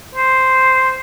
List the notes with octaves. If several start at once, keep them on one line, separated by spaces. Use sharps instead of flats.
C5